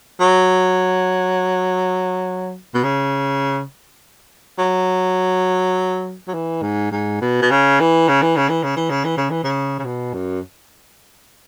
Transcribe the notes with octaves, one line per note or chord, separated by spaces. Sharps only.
F#3
B2
C#3
F#3
F#3
E3
G#2
G#2
B2
B2
C#3
E3
C#3
E3
C#3
E3
C#3
E3
C#3
E3
C#3
E3
C#3
C#3
B2
F#2